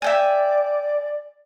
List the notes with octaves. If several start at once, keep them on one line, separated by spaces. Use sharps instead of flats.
D5 E5 G5 G#5